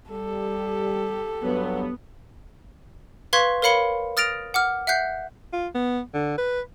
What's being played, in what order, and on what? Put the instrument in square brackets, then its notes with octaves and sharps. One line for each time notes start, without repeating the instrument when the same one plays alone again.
[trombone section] G3 [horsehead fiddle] G4 A4
[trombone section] G2 F#3 [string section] B3
[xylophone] B4 F5 C6 C#6 G#6 B6
A#4 C#5 F5 B5 C#7 G7
D#6 F6 A6 A#6 D7 F7
F#5 D6 F6
E5 F#5 F#6 G6 C7
[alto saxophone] F4
B3
D3
B4